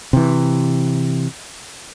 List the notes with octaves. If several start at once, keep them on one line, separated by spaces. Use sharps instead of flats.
C3 E3